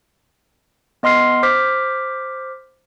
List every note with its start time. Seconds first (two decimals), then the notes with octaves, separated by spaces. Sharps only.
1.03 B3 D#5 C6 F6 C7
1.43 C5 D6 F6 B6